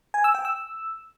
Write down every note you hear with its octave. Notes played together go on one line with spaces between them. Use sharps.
G#5
E6
G5
E6